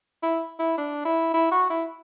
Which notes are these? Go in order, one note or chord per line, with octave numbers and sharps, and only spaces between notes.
E4
E4
D4
E4
E4
F#4
E4